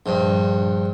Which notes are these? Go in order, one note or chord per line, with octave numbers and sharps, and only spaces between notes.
A#1 G2